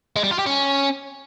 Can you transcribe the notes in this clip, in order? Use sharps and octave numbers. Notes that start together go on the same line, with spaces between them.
G#3
G3
F4
G4
C#4